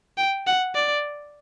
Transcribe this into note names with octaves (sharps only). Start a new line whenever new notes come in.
G5
F#5
D5